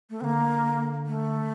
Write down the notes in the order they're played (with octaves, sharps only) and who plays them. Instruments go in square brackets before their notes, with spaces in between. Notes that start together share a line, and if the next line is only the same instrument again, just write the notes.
[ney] A3
[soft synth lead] D3 [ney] A#3 C4
[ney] A3